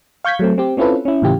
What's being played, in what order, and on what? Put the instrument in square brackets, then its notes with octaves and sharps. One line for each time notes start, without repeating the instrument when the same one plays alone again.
[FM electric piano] F5 C#6 G6 G#6 B6
F#3 A3 C4
C4 G4
C4 C#4 E4 F4 A4 B4
C#4 E4
A2 C#3 E3 F4 G4